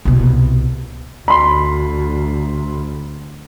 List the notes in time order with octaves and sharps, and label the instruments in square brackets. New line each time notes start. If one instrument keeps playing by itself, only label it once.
[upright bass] C2 B2
[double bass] D2 [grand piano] B5 C6